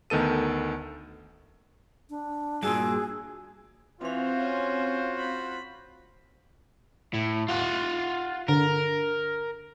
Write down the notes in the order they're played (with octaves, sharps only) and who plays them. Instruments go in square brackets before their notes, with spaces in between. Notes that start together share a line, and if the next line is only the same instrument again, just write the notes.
[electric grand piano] D2 D#3 B3 A4 D#7
[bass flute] D4
[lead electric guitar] G2 A#2 [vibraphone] F#4 E6 [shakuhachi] G#4
[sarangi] E3 [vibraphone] C4 F5 [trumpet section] F4 F#4 C5
[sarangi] C#4
B5
[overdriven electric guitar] A2
F4 F#5
[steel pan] D3 [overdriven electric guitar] A#4